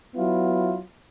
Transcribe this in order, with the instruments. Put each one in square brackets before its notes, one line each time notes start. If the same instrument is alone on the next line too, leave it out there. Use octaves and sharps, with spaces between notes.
[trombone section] F#3 B3 E4 F4